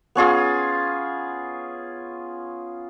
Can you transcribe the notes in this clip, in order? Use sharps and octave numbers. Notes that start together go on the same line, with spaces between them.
B3 C#4 F4 G#4